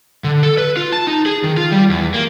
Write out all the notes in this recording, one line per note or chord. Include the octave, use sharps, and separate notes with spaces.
D3
A4
B4
F4
A5
D#4
G#4
D#3
F4
G3
E2
A#3